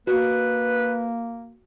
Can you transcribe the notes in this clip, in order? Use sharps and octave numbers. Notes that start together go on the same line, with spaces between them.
A#3 F#4 B4